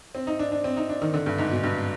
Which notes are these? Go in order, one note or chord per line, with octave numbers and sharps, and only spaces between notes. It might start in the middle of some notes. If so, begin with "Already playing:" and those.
C4
D#4
D4
D4
C4
D#4
D4
D#3
D3
G2
G#2
B2
G2